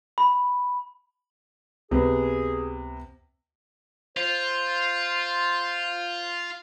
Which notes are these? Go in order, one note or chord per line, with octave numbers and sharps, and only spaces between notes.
B5
C#2 C3 B3 G#4
F4 C5